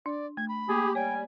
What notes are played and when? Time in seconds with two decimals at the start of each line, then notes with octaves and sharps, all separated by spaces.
0.06 D4 D5
0.37 A3 G#6
0.49 B5
0.69 A#3 G4 G#4
0.95 G3 C#5 G5 G#5